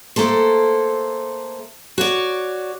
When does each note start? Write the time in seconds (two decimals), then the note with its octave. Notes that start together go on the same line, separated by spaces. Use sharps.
0.16 A3 A#3 A4 C5
1.98 F#4 C#5 D5